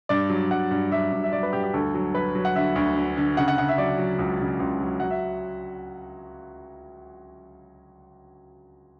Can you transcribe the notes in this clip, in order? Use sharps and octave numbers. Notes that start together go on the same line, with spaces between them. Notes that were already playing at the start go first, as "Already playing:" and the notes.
G2 D5
F#3
G2 F#5
G2
F#3 E5
G2
E5
F#3 D5
B4
G2 G4
G4
D2 A4
F#3
F#3 B4
F#3
F#5
D3 E5
D2
D3
D3
C#3 F#5
F#5
C#3 F#5
E5
F#3 D5
F#3
C#2
C#3
C#2
F#3
F#3 F#5
E5